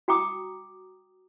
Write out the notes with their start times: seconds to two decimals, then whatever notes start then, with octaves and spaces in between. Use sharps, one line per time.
0.08 F#4 G5 A#5 D6 D#6